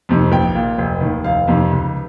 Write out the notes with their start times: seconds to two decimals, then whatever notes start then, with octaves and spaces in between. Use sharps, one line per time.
0.09 F2 C3 D#3
0.32 A#1 G5
0.55 A#2
0.78 F1
1.01 D#2 D#3
1.24 F1 F5
1.48 F2 C3 D#3
1.71 C#2